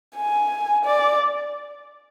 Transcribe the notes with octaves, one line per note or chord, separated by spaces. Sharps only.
G#5
D5